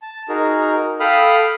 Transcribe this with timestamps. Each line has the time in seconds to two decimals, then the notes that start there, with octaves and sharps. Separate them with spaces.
0.02 A5
0.29 D#4 F#4 G#4 A#4
1.00 A4 F5 G5 B5 D#6 F6